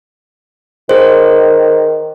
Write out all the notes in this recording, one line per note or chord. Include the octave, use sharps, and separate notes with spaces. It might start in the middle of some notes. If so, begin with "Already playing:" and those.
D#3 G#4 C5